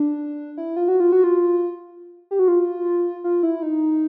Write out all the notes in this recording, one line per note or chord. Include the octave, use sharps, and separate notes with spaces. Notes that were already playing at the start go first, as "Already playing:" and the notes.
Already playing: D4
E4
F4
F#4
F4
F#4
F4
G4
F#4
F4
F4
E4
D#4